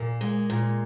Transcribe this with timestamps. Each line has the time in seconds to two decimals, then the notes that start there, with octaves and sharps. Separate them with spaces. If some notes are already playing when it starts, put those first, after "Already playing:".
Already playing: A#2 A#3
0.21 G#3
0.50 A#2